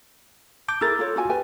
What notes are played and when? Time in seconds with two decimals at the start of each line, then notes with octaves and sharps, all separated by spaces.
0.68 A5 D6 G6
0.81 E4 G#4 A#4 E6 F6 A6
0.99 F4 A4 C#5
1.16 F4 F#4 G#5
1.29 G4 B4 G#5